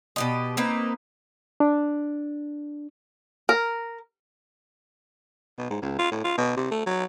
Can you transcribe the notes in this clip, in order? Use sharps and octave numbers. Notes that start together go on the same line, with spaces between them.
B2 G4 D#5
A#3 C4 D#4 B4
D4
A#4
B2
G#2
C#2
F4
A2
F4
B2
C3
A3
F#3